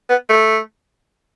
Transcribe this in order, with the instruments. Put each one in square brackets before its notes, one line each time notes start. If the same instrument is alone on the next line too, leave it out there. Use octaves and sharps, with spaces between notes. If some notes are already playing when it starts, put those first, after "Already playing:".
[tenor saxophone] B3
A3